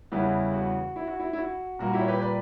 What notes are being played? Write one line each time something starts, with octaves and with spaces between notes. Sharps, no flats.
E2 C#3 E3 G3 B3 E4
F#4
E4
F#4
E4
E4
F#4
A#2 G3 A#3 F#4
E4 G4
C#5
G4 B4
B4 D5